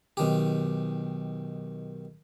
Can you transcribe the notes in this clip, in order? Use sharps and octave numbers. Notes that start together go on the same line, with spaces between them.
B1 D#3 G4